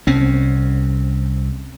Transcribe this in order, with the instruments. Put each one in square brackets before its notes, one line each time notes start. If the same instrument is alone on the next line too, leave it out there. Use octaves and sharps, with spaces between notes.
[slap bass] C2 C4 C#4